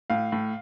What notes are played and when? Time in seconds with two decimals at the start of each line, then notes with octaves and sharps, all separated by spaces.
0.10 A2 F5
0.32 A2